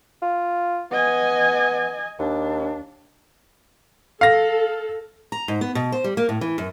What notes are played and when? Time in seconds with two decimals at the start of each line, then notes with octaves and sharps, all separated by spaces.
0.22 F4
0.92 B3 D#5 G#5
2.19 D#2 D4
4.21 A4 F5 A#6
5.32 A#5
5.48 G#2
5.61 B3
5.75 B2
5.92 C5
6.04 G3
6.17 A#3
6.29 A2
6.41 E3
6.58 F#2